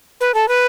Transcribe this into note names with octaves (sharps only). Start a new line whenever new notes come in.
B4
A4
B4